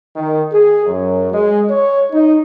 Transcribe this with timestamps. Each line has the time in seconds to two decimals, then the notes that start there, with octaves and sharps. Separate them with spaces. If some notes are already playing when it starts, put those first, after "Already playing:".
0.16 D#3
0.52 G#4
0.87 F#2
1.32 G#3
1.70 C#5
2.12 D#4